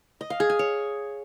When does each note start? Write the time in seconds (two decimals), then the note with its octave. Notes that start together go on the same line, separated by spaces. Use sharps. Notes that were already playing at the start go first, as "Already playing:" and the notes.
0.21 D#5
0.30 F5
0.40 G#4
0.50 G#5
0.59 C#5